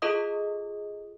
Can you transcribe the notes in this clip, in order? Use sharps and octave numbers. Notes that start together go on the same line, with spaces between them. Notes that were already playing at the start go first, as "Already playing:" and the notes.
F4 G#4 A4 D#5 D#6